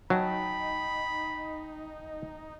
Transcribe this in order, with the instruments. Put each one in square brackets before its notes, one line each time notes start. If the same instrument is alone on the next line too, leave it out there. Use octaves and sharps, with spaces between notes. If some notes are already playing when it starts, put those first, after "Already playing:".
[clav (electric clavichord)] F#3 [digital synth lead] D#4 [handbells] G5 A5 [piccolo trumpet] B5